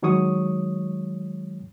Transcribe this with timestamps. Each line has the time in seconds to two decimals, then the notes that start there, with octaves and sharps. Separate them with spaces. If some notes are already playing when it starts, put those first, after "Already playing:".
0.02 D#3 F#3 G#3 C#5 C#6 D#6